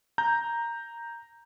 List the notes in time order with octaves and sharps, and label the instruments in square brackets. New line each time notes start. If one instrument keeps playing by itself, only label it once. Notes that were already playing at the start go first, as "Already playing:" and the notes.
[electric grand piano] A#5 G6